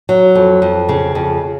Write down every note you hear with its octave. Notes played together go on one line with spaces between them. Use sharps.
F#3
F2
F2
C#3
F2